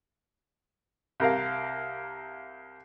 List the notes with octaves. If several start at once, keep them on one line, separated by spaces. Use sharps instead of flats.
C2 A#4 F5